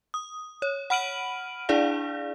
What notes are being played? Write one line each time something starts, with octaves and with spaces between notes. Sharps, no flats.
D#6
C#5
F#5 B5 F6 D7 D#7 F#7
D4 E4 G#4 D5 F5